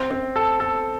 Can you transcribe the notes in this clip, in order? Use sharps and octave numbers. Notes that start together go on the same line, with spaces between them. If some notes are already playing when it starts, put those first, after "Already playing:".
Already playing: C4
C4
A4
A4